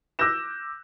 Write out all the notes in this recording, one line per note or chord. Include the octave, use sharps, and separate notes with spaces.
D6 E6 F#6 G6 A#6 E7